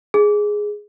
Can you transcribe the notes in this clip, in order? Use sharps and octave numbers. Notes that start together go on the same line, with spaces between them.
G#4